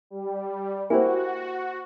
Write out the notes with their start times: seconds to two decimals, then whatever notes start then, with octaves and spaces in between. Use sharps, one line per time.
0.10 G3
0.90 A#3 E4 F#4 G4 C5 G#5